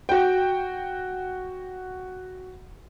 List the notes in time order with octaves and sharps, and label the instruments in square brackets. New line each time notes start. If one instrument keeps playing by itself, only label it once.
[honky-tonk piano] F#4 G5